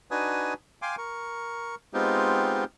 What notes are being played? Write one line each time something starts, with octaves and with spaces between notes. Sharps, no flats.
D4 D#4 F#4 B4 G#5 D#6
F5 G5 G#5 C6 D6
A#4 C#6
G#3 B3 C4 D#4 F4 G4